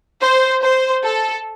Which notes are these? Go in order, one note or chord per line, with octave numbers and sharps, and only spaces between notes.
C5
C5
A4